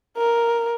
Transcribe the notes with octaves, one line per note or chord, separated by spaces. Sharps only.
A#4